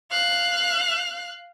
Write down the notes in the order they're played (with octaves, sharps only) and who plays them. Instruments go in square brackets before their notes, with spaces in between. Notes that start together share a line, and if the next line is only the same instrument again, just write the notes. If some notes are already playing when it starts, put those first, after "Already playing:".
[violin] F5 F#6